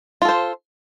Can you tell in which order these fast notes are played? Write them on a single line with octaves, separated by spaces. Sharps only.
F4 A4 C5